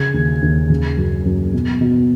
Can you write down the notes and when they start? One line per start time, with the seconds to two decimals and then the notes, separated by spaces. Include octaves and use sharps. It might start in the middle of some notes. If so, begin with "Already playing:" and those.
Already playing: C#3 G#6
0.14 D#2
0.42 D#2
0.70 C#3
0.97 F#2
1.25 F#2
1.53 B2
1.81 B2